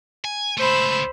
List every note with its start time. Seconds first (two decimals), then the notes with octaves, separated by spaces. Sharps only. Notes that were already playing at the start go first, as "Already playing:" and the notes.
0.25 G#5
0.57 C#2 A3 C5 B5 E6